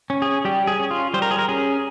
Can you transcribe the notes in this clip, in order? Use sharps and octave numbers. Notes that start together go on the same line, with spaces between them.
C#4
G#4
G3 G4
G#4
C#4
F4
G3 C5
A#4
G#4
A#4
C#4 G#4